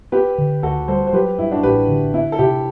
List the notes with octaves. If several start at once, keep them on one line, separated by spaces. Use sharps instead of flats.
B3 G4 B4
D3
D2 F#4 A4
G3 A4 C5
C5
F#3 G4 B4
G2 E4
D4 F#4
A1 G4 B4
D3
B3 E4
A4
C3 E4 G4